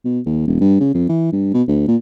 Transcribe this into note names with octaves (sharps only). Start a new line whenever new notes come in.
B2
D#2
E1
G2
C#3
F2
E3
G2
B2
D2
A#2